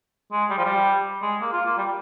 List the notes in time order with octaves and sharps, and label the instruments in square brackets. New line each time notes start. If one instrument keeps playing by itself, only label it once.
[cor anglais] G#3
G3
F3
G3
G#3
A#3
F4
A#3
G3